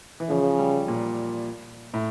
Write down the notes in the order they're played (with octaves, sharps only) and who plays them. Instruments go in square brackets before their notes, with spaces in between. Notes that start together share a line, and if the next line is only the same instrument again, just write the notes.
[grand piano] E3
[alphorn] C#3 [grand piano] F3
[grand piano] G3
A#2
A2